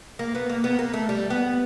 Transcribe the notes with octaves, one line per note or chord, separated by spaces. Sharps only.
A#3
B3
A#3
B3
A#3
A3
G3
B3